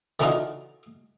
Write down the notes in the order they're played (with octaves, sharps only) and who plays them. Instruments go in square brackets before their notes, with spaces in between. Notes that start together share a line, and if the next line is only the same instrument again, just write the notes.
[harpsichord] D3 E3 D4 D#4 F4 F#4